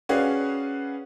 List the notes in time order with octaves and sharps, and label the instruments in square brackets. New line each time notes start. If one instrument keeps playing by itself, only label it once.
[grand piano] C#4 F#4 G#4 B4 D5 F5